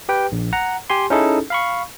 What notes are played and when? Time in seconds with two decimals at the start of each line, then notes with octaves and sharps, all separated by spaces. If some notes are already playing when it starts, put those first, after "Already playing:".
0.09 G4 B4 G5
0.32 A#1
0.53 F#5 A#5
0.90 G4 G#5 C6
1.10 C#4 D#4 E4 G#4 A4
1.50 F5 B5 C#6